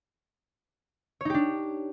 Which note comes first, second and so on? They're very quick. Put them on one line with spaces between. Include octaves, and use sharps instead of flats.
C#5 D#4 G4 D4